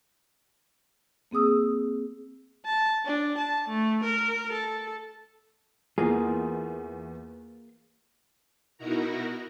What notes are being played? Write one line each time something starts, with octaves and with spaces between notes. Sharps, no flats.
A#3 C4 G#4 D#6 E6
A5
D4
A5
A3
A#4
A4
E2 A#3 F4 G#4
B2 D#4 E4 F#4 A#4 A#5